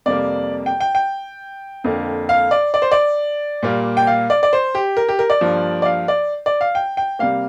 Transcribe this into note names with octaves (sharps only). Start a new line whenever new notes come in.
F2 C3 G3 A#3 D5
G5
G5
G5
F2 D3 A#3
F5
D5
D5
C5
D5
A#2 G3 A#3
G5
F5
D5
D5
C5
G4
A#4
G4
A#4
D5
G2 F3 A#3
D5
F5
D5
D5
F5
G5
G5
C3 G3 A#3 F5